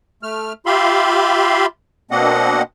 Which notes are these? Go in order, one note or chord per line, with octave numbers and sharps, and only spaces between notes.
A3 F6
F4 G4 E5 F5 B5 C6
B2 A#3 C4 D4 D#5 F#5